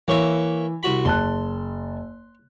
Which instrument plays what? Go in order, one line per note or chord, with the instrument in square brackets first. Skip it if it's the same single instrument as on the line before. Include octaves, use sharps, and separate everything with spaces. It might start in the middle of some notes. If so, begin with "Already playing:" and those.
[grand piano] E3 [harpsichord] A#3 C#5 E5
[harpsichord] C2 F#4 B5
[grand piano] F#1 A5 F#6 [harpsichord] C6